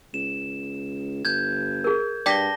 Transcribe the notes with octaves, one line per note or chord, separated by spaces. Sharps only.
C#2 E7
G1 G6 G#6
G#4 A#4
G2 D5 G5 A5 D6 A#6 B6 G7